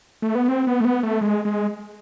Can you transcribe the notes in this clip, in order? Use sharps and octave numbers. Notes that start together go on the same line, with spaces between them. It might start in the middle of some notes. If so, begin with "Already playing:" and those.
A3
B3
C4
B3
A3
B3
A3
G#3
G#3